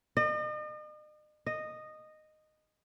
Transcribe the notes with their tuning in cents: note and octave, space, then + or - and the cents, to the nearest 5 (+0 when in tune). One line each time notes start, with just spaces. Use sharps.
D#5 -40
D#5 -10